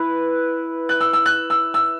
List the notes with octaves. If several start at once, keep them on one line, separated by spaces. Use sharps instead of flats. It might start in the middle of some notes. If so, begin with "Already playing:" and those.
Already playing: E4 B4
F#6
E6
E6
F#6
E6
E6